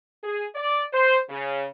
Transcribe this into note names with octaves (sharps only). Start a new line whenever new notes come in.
G#4
D5
C5
C#3